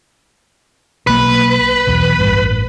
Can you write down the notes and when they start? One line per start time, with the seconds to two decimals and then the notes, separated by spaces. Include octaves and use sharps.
1.07 B1 A#3 B4
1.87 B1 E2
2.19 A1 G2